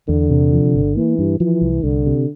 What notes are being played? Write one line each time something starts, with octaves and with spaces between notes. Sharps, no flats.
E2 D3
C3
F3
G1
E3 A#3
G2
E3 F3
C2
C2 D3
C3